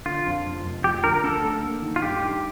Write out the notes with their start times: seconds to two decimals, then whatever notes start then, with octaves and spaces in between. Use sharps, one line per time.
0.06 D3 F4
0.26 F2
0.46 F1
0.65 F1
0.84 F3 G4
1.04 D3 A#4
1.14 A#4
1.24 D2 A4
1.43 A3
1.63 A#3
1.82 D#3
1.96 F4
2.02 G2 G4
2.21 D#4